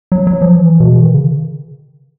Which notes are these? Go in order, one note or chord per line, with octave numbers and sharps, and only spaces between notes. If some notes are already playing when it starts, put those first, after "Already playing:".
F#3
F#3
F3
E3
B2
E3
D#3
C#3